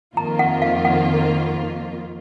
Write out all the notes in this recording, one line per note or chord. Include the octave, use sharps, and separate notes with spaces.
F2 D#3 A#3 F4 A#5
F#5
F5
F#5